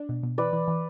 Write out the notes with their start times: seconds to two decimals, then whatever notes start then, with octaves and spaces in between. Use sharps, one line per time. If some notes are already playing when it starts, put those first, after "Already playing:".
Already playing: D4
0.09 B2
0.23 B2
0.38 E3 B4 D5
0.53 E3
0.68 E3